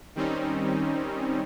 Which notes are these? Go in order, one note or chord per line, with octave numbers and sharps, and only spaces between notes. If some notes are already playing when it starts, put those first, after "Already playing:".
D#3 G3 C4 C#4 D#4